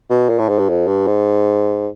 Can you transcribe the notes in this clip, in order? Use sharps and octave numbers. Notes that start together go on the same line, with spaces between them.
B2
A#2
A2
G#2
G2
F2
G2
G#2